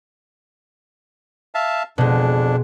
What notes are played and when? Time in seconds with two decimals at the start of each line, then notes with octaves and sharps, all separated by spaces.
1.55 E5 F5 A5
1.98 F2 B2 G#3 D4